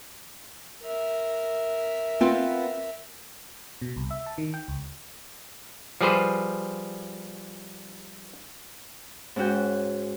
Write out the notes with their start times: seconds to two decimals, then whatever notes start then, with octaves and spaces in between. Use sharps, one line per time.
0.82 A#4 E5
2.21 B3 C4 F4
3.82 B2
3.96 C2
4.11 E5
4.26 A5
4.38 D#3
4.54 G5
4.68 C#2
6.01 F3 G3 G#4 B4 C5
9.36 G#2 C#4 F#4 G5